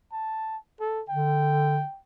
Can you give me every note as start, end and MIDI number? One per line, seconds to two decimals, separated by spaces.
0.12 0.57 81
0.80 1.03 69
1.09 1.82 50
1.09 1.99 79